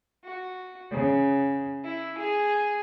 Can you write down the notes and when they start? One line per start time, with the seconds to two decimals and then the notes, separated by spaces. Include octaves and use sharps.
0.24 F#4
0.90 C#3
1.84 E4
2.19 G#4